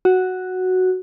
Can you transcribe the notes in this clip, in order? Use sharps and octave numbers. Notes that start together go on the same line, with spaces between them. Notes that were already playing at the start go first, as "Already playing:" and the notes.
F#4